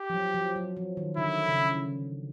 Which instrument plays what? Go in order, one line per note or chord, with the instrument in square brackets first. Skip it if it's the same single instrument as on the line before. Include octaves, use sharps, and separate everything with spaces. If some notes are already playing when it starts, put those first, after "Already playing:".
Already playing: [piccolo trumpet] G4
[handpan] F3
F#3
F3
F#3
F3
D#3
[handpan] D3 [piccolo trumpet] E4
[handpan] C#3